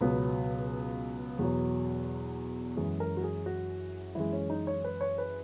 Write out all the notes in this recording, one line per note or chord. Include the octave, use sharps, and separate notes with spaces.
C#2 B2 F#3 B3
E2 B2 F#3
F#2 E3 G#3 G#4
A#4
F#4
G#4
F#4
F#2 E3 G#3 E4
C#4
D#4
C#5
B4
C#5
B4